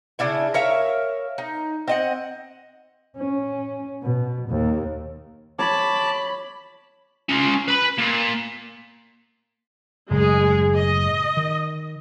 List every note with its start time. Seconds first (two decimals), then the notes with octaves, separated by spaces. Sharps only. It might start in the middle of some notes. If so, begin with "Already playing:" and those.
0.19 C#3 D4 E4 G#5
0.54 A#4 C#5 E5 F5
1.38 D#4
1.88 C4 D#5 F#5
3.17 C#4
4.03 B2
4.49 D#2
5.59 C#5 A5 B5 D6
7.29 C#4 F4
7.68 B4 B5
7.98 A#2
10.11 F#1 A2 G#3 G#4
10.77 D#5
11.37 D#3